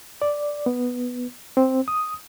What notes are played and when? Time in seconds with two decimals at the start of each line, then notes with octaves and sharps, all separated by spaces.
0.22 D5
0.66 B3
1.57 C4
1.88 D#6